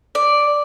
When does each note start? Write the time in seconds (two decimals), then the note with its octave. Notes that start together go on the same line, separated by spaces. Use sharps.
0.15 D5